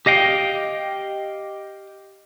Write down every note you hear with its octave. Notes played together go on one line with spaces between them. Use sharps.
G4 D#5 F5 G5